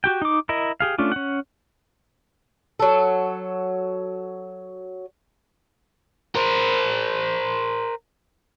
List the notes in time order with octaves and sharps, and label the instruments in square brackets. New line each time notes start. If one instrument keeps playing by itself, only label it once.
[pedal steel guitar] F#4 G4 G5
D#4 D6
E4 A#4 D#5
G4 G#4 F5
A3 C#4 D4 F4
C#4 F#5
[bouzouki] F#3 A4
[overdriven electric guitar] A#4 C5